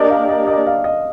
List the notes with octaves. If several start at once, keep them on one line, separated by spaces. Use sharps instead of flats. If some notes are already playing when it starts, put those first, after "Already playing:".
Already playing: A#3 D4 G4 A#4 D5 D#5
F5
D#5
D#5
F5
D#5